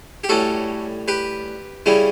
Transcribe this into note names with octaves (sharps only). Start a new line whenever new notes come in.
G4
A2 G3 C#4 F#4 A4
G4 B4
C#3 G3 C#4 E4